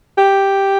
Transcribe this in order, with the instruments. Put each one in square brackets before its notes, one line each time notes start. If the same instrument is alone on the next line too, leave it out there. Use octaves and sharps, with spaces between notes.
[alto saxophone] G4